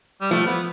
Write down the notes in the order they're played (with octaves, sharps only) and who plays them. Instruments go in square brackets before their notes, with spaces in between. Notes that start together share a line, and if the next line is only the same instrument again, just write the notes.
[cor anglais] G3
[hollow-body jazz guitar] F3 [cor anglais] A3
[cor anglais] B3